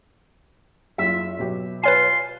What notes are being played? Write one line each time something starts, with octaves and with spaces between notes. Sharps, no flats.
F#1 F4 E5
B2 F#3 G4
F4 B4 C#5 G#5 C6